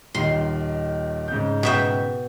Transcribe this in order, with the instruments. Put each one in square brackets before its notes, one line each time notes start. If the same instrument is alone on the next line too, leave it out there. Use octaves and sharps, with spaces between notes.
[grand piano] D#1 D#3 [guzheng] C6
[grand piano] G#2 C#3 G6
[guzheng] B2 E5 G5